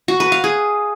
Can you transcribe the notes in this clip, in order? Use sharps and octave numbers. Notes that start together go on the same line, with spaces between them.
F#4
B4
F5
G#4